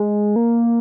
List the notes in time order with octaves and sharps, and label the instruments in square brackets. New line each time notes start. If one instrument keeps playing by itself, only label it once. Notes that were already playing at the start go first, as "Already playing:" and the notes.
Already playing: [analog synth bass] G#3
A#3